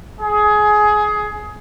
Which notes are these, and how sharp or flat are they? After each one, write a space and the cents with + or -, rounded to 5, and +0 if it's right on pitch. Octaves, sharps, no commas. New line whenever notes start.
G#4 +20